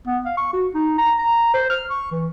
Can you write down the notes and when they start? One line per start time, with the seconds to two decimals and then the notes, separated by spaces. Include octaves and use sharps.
0.07 B3
0.25 F5
0.37 C#6
0.53 F#4
0.74 D#4
0.98 A#5
1.19 A#5
1.54 C5
1.70 F6
1.90 C#6
2.11 E3